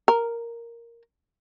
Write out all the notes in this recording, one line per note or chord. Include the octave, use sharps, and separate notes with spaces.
A#4